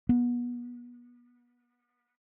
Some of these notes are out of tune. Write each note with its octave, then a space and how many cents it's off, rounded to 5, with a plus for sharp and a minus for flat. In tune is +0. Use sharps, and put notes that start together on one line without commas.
B3 -30